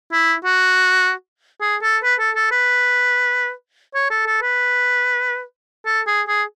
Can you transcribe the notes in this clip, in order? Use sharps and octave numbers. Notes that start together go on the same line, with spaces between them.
E4
F#4
G#4
A4
B4
A4
A4
B4
C#5
A4
A4
B4
A4
G#4
G#4